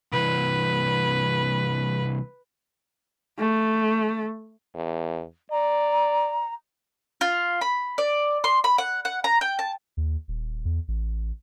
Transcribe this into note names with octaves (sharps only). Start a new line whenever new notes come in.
C2 E3 B4
A3
E2
D5 A#5
F4
B5
D5
C6
B5
F#5
F#5
A#5
G5
A5
D#2
D#1
E2
A1